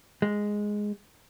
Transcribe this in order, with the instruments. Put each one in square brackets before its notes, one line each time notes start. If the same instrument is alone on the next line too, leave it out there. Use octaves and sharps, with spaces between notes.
[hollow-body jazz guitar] G#3